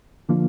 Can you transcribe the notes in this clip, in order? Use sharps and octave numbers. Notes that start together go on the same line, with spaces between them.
D3 F3 A#3 D4 F4